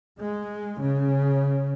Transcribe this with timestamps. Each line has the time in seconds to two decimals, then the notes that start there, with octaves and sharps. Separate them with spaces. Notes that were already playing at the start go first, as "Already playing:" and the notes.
0.18 G#3
0.81 C#3